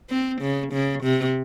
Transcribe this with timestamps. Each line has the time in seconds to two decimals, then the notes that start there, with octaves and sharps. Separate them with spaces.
0.10 C4
0.41 C#3
0.73 C#3
1.03 C3